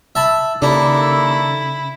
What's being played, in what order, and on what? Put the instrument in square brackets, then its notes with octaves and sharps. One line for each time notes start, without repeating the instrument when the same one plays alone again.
[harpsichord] E5 A5 B5
[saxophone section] D#2 A4 [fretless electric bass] C#3 [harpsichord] D4 [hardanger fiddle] E4